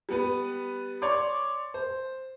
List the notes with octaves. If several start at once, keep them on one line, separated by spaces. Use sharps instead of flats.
G3 B3 B4
C#5 D5 C6 D6
C5